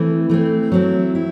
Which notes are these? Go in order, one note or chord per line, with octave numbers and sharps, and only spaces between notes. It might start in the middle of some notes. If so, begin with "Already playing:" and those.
Already playing: E3 A3 C4
E3 A3 C4
F#3 C4 E4
E4